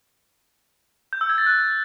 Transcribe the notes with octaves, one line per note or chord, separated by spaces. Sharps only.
G6
E6
G#6
A6
F#6